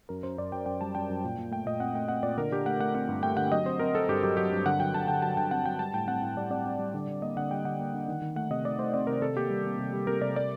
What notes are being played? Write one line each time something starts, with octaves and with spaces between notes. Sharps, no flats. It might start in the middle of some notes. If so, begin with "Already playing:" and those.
F#2 A#4
F#2 C5
F#2 D5
F#2 G5
F#2 G5
G3 A5
F#2 G5
F#2
A#2
A#2
A3 G5
A#2 D#5
C4 F#5
A3 G5
C4 F#5
A#2 D5
D3 A#4
D3 G4
A3 F#5
A3 F#5
C4 F#5
G2
A3 G5
D3 F#5
F#3 D#5
C4 C5
C4 A#4
C4 A4
G2 G4
F#3 G4
F#3 G4
G2
D3 F#5
F#3 G5
D3 A5
D3 G5
F#3 A5
D3 G5
C4 F#5
F#3 G5
G3 A5
A2 G5
C4 F#5
A2
G3 D5
C4 D5
C4
G3
D3
D3
A#3 D#5
D3 F#5
G3 G5
D3 F#5
A#3
D3
D#3
D#3
A3 F#5
C3 D#5
A3 D5
A3 C5
C4 D5
C3 A#4
C3 A4
A#3 G4
G3
A#3
C3
G3
C3 A#4
C3 D5
G3 D5